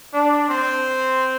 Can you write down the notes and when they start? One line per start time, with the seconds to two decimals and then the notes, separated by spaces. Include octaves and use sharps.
0.14 D4
0.47 C4